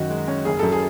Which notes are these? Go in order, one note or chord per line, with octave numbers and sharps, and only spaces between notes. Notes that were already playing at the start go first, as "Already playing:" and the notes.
Already playing: F#2 D#3 F#4
G#3
C#4
F#1 G#4
F#2 A4
G#4